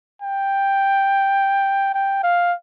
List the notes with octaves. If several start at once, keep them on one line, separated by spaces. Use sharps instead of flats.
G5
G5
F5